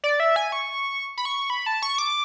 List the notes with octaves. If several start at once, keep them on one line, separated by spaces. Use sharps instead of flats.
D5
E5
G#5
C#6
B5
C#6
B5
A5
C#6
D6